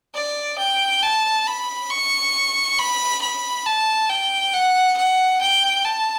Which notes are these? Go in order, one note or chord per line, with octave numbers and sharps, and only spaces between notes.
D5
G5
A5
B5
C#6
B5
B5
A5
G5
F#5
F#5
G5
A5